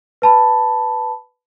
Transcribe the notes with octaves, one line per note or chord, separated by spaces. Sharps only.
B4 A5 B5